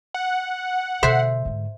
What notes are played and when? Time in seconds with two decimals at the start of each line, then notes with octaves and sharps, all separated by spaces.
0.14 F#5
1.03 B2 D3 C5 E5
1.45 G#2 D3